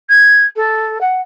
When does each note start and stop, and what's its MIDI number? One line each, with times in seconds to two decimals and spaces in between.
0.09 0.44 92
0.56 0.98 69
1.01 1.20 78